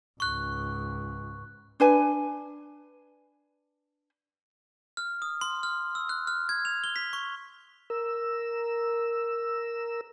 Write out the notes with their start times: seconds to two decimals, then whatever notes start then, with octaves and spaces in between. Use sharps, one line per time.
0.20 C#2 G#2 C#6 F#6
1.80 D4 B4 G#5
4.97 F6
5.22 D#6
5.41 C6
5.63 F6
5.95 E6
6.09 F#6
6.27 F6
6.49 G#6
6.65 F7
6.84 G7
6.96 B6
7.13 C#6
7.90 A#4 E6